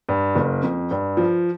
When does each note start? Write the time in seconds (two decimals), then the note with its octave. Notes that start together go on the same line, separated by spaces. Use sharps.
0.09 G2
0.35 F#1
0.63 F2
0.91 G2
1.17 F3